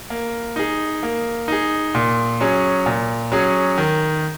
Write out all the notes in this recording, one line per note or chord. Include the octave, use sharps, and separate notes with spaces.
A#3
D#4 G#4
A#3
D#4 G#4
A#2
F#3 C#4 G#4
A#2
F#3 C#4 G#4
D#3